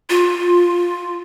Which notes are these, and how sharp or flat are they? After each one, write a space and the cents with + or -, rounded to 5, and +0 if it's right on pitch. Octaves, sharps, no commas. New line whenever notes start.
F4 +10